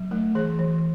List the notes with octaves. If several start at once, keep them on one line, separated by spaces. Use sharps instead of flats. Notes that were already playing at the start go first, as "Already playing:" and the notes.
Already playing: F#3
A3
E3 G#4
E3